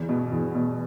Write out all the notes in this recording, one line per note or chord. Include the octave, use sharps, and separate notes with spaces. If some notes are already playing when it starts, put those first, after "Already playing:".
Already playing: E2
B2
E2
B2